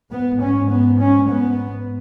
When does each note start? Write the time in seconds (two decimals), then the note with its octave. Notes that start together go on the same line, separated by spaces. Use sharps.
0.11 G#2 B3
0.41 C#4
0.71 B3
1.00 C#4
1.29 B3